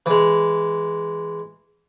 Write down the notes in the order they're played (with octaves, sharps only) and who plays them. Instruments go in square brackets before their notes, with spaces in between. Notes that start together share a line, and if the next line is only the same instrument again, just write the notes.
[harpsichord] E3 G#3